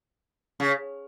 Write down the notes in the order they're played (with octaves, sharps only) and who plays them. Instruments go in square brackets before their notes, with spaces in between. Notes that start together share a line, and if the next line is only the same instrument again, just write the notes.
[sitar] C#3